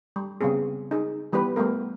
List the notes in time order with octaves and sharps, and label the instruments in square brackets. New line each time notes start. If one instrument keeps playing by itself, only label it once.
[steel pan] G3
C#3 G3 B3 C4 G#4
D#4 G#4
E3 G3 B3 G4 B4
G3 A3 B3 A#4